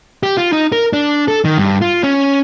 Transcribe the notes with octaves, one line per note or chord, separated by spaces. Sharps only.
G4
F4
D#4
A#4
D4
A4
D#3
G2
F4
C#4